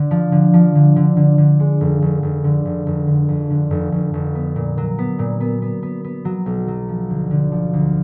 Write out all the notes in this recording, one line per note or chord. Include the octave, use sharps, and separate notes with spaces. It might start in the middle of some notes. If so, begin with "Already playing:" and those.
Already playing: D3
F3
D3
F3
D3
D3
D3
D3
G#3
F1
F1
F1
D3
F1
F1
D3
F2
D3
F1
F1
F1
B3
A#2
F#3
B3
A#2
B3
B3
B3
B3
F#3
B1
F#3
F3
D2
D3
F3
D2